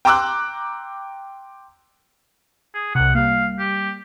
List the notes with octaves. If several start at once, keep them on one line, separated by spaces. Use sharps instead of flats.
G5 A#5 C6 D6 E6 F#6
G#4
C2 C3 F#5
G3 A#3 F5
G4